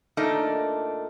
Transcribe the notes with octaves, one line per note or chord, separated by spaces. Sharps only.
A#2 A3 D4 D#4 A#4 D#5